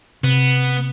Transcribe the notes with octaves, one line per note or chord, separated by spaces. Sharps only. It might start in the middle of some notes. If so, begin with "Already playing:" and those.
C3 B3